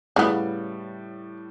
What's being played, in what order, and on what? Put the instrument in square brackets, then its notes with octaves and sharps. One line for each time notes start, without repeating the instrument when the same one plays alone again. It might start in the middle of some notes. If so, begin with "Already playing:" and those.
[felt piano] A2 G3 [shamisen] C#3 B3